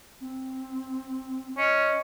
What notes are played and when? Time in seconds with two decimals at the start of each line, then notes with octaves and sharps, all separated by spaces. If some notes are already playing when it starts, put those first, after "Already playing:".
0.21 C4
1.57 C#4 D#5